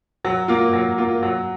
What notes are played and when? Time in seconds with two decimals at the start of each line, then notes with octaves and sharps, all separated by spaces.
0.25 F#3
0.48 A#3 F4
0.73 F#3
0.98 A#3 F4
1.23 F#3